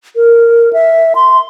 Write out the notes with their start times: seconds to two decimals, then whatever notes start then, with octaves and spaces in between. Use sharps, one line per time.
0.16 A#4
0.73 E5
1.15 C6